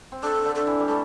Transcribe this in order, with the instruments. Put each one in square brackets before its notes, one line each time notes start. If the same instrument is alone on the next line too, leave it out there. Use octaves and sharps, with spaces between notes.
[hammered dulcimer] C4
[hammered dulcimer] D4 [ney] A4
[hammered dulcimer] D3
[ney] A4
[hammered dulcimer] E3
G3
[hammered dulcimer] A3 [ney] A4